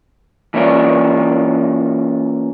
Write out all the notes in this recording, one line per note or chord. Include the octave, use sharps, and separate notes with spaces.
E3 A#3 C#4 F4 D5